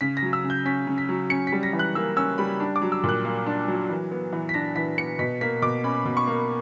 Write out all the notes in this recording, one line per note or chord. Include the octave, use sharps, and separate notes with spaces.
C#3 B6
A#6
F#3
E6
C#3
G6
C#4 B6
C#3
B6
F#3
C#4 C#7
B6
G3
A#6
E3
F#6
A#3 E6
C#4 E6
G3 B5
D4
D6
F#3
E6
A#2 F#6
A#3
D4
F#3
E3
B3
E3
B6
D4 A#6
E3 B6
B3 C#7
B2 B6
A#3 B6
B2 D6
C#4 B5
B2
C#6
A#3